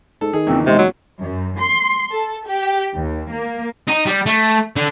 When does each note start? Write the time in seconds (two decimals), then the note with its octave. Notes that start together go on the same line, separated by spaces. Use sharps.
0.21 G#2 A4
0.33 D#3 G#4
0.47 E2 A#2 C#3 C4
0.66 C3 G#3
0.78 F#3
1.20 F#2
1.58 C6
2.11 A4
2.47 G4
2.93 D#2
3.30 A#3
3.88 D#4
4.06 G3
4.26 A3
4.77 D3